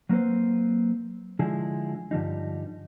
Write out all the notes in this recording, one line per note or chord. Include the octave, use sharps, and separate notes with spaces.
F#3 A#3 C4 B4 C5
D3 F3 G#3 E4 G#4
G2 D3 F3 G3 D#4